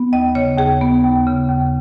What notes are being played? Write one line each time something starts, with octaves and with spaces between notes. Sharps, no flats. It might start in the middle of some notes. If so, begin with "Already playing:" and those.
Already playing: B3
D#2 D#5
C#3 C#5
D#2 G#4
B3
D#2
C#3
D#2